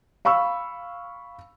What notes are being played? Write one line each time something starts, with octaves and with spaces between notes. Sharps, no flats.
F5 B5 C#6 E6